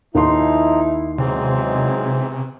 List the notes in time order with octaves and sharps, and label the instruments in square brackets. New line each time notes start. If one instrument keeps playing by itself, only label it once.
[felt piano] D#2 C6 [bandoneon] F3 D#4 [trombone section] E4
[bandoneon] G#2 E3 C4 [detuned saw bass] C3 [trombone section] F#3 G#3 D#4